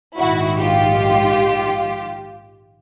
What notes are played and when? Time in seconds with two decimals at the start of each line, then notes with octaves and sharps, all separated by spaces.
0.18 A#1 G#2 D#3 E4 F#4
0.59 F4 G4